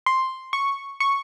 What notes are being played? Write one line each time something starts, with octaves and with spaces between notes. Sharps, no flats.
C6
C#6
C#6